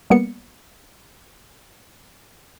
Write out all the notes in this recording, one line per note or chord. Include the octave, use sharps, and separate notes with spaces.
G3 A#3 B3 C#7